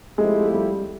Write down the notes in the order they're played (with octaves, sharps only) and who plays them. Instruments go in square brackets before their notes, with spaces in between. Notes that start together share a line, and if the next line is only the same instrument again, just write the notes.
[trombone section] F3 A3 C4 E4 G4 [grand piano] G#3
[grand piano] G3